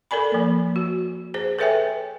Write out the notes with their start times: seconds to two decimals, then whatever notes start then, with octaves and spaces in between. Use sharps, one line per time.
0.11 A4 A#4 D5 G#5 B5
0.32 F3 A#3
0.76 F#4
1.34 G#4 C5
1.59 A4 B4 C#5 E5 G5 G#5